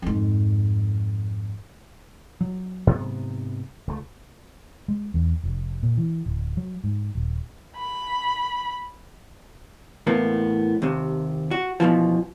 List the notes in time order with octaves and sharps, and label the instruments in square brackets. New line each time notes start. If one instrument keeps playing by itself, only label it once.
[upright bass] F2 G#2
[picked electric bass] F#3
[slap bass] G#2 C3 B3
C#2 A3
[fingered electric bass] G#3
E2
F1
A#2
E3
D1
F#3
G#2
D#1
[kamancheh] B5
[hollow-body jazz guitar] A2 E3 A#3 B3
D#2 C3
F#4
F#2 B2 E3 F3